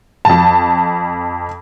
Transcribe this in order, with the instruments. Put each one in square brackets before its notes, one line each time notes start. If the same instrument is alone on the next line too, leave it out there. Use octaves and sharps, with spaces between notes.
[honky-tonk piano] F2 A5